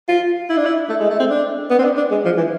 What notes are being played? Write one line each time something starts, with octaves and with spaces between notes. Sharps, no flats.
F4
E4
D4
E4
A3
G#3
A3
C4
D4
B3
C4
D4
D4
G#3
F3
E3